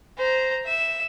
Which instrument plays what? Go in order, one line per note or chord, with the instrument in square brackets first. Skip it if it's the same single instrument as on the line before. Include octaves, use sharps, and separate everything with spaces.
[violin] C5 A#5
E5 E7